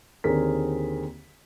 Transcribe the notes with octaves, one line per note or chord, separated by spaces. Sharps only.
D#2 D3 C4 G#4 A#4 B6